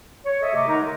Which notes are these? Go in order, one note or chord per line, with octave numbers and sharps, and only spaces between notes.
C#5
A4 D#5 E5
C3 A3 G4 D#5 D6
D3 G#3 D#4 A#4 A#5
G#3